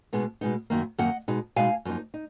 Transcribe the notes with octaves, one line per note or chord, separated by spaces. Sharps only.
B2 G#3 B3 D#4
B2 G#3 B3 D#4
F#2 D#3 A#3
F#2 D#3 A#3 D#5 F#5
B2 G#3 D#4
B2 G#3 D#4 F5 G#5
F#2 F3 A#3 D#4
D#4